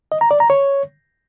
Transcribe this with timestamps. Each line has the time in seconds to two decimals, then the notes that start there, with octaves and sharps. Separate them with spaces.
0.12 D#5
0.21 A#5
0.31 D5
0.40 A#5
0.50 C#5